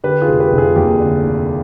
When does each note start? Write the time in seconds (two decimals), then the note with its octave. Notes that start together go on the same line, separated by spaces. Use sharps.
0.04 D3 G4 B4
0.22 F4 G#4
0.28 F1
0.40 G4 B4
0.52 F1
0.58 F4 G#4
0.76 D#2 G4
1.01 D3
1.24 F1